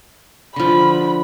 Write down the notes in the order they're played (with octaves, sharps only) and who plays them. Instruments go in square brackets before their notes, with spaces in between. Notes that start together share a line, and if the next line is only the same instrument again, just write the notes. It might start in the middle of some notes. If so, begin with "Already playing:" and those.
[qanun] D3 F3 [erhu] B5